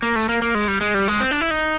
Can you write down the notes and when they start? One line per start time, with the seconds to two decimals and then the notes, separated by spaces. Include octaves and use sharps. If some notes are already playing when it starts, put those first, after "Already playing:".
0.02 A#3
0.16 A3
0.29 A#3
0.42 A#3
0.55 G#3
0.68 G3
0.81 G#3
0.94 G3
1.08 G#3
1.20 C4
1.31 D4
1.41 E4
1.51 D#4